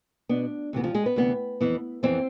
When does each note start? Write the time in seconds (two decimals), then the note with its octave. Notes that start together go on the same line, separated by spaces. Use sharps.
0.29 B2 B3 D4
0.73 D2 C3 E3 B3
0.84 F3 F4
0.94 G#3 G#4
1.06 B3 B4
1.16 D2 C3 E3 B3
1.61 F2 E3 B3
2.03 F2 E3 B3 C4 C5